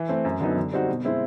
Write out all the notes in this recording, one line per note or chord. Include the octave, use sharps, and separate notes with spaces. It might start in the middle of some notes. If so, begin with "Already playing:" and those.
Already playing: E3
A3 C4
F#2
D3 F#3 B3 D#4
D3
G3 C4 D#4 F#4
B2
G#3 C4 E4